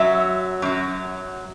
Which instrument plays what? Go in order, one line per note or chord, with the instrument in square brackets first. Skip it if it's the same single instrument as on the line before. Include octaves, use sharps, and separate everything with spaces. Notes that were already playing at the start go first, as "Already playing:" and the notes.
Already playing: [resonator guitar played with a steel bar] F#2 F#3 E5
F#2 F#3